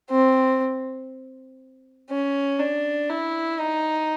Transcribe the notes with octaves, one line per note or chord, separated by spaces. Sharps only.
C4
C#4
D4
E4
D#4